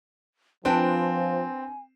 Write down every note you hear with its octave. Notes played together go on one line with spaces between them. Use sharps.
F3 C4 D4 B4 G5 G#5